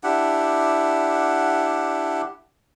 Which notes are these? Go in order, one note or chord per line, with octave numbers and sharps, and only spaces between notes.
D4 E4 G4 F#5